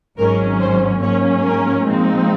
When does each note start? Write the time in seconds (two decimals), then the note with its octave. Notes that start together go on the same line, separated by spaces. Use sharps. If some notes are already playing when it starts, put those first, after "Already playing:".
0.18 G#1 G#2 F#3 C#4 A#4
0.60 C5
1.01 G#2 F#3 A#3 C#4 C#5
1.45 A#4
1.87 A#2 F3 G#3 C4 D#4